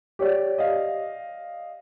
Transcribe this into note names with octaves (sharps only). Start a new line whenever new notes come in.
G4 C#5 D5
D#5 F5